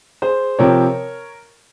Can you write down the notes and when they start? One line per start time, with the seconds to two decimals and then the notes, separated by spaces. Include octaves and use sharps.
0.22 G#4 C5
0.59 C3 F3 C4 A#4 C#5